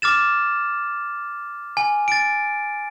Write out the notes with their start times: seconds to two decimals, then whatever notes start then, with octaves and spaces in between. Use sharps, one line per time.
0.02 D6 F6 A6 E7
1.77 G#5
2.08 A6 D7